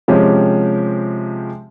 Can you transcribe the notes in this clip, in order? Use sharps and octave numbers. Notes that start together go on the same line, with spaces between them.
C3 F3 G#3 C#4 G4